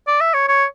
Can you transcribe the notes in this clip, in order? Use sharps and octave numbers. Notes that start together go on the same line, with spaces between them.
D5
E5
C#5
C#5